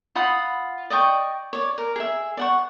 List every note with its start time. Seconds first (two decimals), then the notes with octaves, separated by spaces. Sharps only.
0.15 F4 F#5 B5 D#6
0.90 D5 D#5 G5 C#6
1.53 C#5 D5
1.78 A#4
1.96 G#4 E5
2.37 D5 F#5 C#6